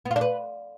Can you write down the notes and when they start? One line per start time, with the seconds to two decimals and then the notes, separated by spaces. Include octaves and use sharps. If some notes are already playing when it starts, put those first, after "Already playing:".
0.05 B3
0.11 F4
0.16 D4
0.21 B4